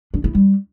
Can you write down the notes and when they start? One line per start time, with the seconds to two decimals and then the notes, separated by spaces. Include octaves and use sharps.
0.14 D4
0.24 E4
0.35 G3